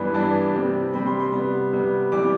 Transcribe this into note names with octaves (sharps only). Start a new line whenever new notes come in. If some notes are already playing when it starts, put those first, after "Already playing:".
Already playing: G2 E3 B3 D4 B5
G2 E3 B3 D4 A5
C3 G3 C4
C3 G3 C4 B5
C6
C6
C3 G3 B3
C3 G3 B3
C3 E3 G3 D6